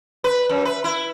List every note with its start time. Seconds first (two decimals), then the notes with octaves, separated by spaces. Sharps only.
0.24 B4
0.49 F#2
0.65 B4
0.84 E4